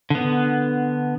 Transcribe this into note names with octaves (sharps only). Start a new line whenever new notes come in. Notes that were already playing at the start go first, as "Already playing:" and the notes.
D3 B3